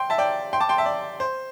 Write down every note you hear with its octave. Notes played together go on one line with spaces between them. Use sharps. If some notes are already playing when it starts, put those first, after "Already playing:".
Already playing: G5 C6
E5 A5
D5 G5
G5 C6
A5 D6
G5 C6
E5 A5
D5
C5